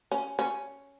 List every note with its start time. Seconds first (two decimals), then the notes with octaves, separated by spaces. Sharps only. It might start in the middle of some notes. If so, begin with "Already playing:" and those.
0.11 C#4
0.39 C#4